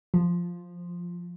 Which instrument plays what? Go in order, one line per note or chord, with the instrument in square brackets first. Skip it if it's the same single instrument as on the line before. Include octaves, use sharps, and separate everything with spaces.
[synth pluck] F3